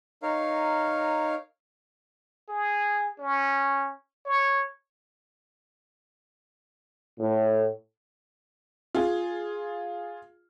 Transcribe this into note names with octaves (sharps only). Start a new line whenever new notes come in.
D#4 A#4 C#5 F5
G#4
C#4
C#5
A2
F4 G#4